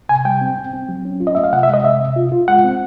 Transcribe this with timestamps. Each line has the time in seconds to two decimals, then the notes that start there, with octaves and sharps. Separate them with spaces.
0.09 C3 G#5
0.25 G3 G5
0.41 C4
0.57 C4
0.73 C4
0.89 F#3
1.05 C#4
1.20 F4
1.27 D#5
1.35 A3 E5
1.44 F5
1.52 C3 F#5
1.63 E5
1.69 G#3 D#5
1.84 C3 E5
2.00 C3
2.16 F4
2.32 F4
2.48 G#3 F#5
2.64 C4